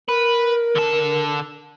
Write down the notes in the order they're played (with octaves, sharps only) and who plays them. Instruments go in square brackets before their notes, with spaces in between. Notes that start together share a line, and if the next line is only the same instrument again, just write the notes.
[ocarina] A#4 [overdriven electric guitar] B4
[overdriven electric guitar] D3 A5